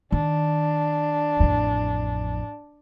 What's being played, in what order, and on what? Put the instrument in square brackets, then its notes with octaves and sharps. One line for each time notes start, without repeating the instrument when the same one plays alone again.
[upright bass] D#3 [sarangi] D4
[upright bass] A1 F2